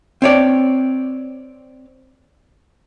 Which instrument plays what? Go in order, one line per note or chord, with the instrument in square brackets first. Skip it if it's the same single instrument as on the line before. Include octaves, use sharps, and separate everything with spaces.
[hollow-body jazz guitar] C4 C#5 D5